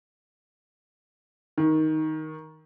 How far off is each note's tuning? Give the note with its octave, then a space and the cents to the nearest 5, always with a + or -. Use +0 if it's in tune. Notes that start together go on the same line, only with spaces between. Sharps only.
D#3 +10